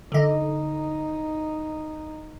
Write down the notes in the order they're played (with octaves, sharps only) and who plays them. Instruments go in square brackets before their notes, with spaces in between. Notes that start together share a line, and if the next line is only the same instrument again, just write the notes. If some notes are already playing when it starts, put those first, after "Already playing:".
[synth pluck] D3 D#5 [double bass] D#4